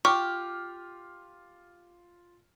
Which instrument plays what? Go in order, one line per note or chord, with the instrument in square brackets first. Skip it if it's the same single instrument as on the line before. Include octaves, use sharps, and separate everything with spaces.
[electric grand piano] F4 F6 [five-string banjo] G4 [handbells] C#6